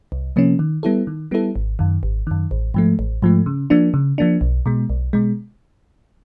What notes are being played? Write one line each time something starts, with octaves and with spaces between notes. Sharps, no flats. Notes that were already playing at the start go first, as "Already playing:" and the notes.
C2
C3 F3 A#3 C#4
D#3
G3 B3 E4 A4
D#3
G3 B3 E4 A4
G#1
F#2 D#3
G#1
F#2 D#3
A1
G#2 F3 A3
A1
G#2 F3 A3
C#3
F3 A#3 D4
C#3
F3 A#3 D4
B1
B2 G#3
B1
B2 G#3